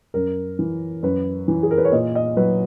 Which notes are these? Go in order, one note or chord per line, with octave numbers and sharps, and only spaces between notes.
F#2 A#4
E3
F#2 B4
E3
G#4
A#4
B4
C#5
A#2 D#5
D#5
F#3 B4